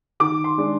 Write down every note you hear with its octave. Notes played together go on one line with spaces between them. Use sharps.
D#3 D6
C6
G#3 D4